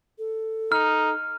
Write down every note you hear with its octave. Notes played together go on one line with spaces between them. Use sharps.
A4
D#4 F6